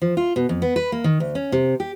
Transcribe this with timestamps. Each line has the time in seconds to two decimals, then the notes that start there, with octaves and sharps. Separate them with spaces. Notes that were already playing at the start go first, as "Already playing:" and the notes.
0.02 F3
0.17 F4
0.36 B2
0.49 F2
0.62 B3
0.76 B4
0.92 A#3
1.04 D#3
1.20 D2
1.35 C#4
1.52 C3
1.80 G4